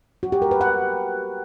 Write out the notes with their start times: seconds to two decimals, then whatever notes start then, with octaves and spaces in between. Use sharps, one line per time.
0.23 F#4
0.32 G4
0.42 A#4
0.51 B4
0.61 F#5